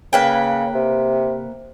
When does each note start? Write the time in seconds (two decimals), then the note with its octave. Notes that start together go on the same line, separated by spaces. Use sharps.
0.13 C#3 A#3 B4 G5
0.75 C3